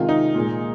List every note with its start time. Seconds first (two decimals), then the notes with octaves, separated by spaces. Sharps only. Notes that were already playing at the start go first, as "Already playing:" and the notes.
Already playing: C3 D#3 G#3 F4
0.09 D#4
0.35 A#2 G#3